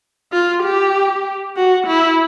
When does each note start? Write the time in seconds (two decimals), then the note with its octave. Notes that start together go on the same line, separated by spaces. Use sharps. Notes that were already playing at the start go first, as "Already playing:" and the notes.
0.32 F4
0.63 G4
1.56 F#4
1.87 E4